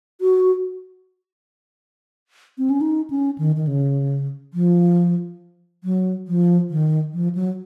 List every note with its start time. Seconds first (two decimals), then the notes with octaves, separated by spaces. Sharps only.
0.21 F#4
2.58 C4
2.70 C#4
2.81 D#4
3.10 C#4
3.38 D#3
3.56 D#3
3.67 C#3
4.54 F3
5.84 F#3
6.28 F3
6.70 D#3
7.13 F3
7.35 F#3